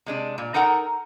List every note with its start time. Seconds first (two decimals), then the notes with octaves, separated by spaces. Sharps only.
0.06 C3 G#3 D4
0.38 A#2
0.54 D#4 A4 A#4 F#5 A#5